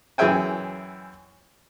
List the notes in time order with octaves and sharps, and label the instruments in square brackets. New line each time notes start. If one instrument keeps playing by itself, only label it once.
[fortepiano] F#2 E3 G#4 E5 G5 G#5